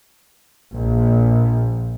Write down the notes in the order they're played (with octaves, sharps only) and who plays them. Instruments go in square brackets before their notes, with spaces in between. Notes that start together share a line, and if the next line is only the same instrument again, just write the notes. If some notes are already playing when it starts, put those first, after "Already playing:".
[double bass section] A#1